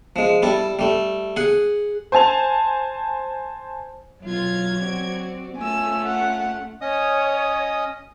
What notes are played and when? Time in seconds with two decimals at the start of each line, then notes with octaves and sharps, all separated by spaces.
0.16 F3 G#3
0.42 G3 E4 A4
0.79 G3 A3
1.36 G#4 F#5
2.12 C5 G#5 A5 F7
4.24 B2 F#3 F4 G#6
4.79 C4 F#4 D5
5.57 A3 C#4 F4 G#5 E6
6.06 F#5
6.81 C#4 C#5 D#5 D#6